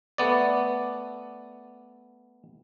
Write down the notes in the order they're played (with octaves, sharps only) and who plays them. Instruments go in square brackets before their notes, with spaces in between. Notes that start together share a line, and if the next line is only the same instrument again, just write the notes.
[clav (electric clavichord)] A3 B3 D5